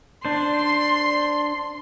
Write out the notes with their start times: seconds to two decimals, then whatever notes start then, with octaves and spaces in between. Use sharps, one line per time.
0.25 D4 C5 C6